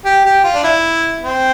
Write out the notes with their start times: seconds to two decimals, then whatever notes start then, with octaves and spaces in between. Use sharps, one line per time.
0.05 G4
0.25 G4
0.44 F4
0.54 D4
0.64 E4
1.23 C4